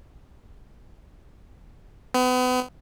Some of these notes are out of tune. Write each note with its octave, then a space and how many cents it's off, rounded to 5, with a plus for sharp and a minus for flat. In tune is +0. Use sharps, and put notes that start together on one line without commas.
B3 +35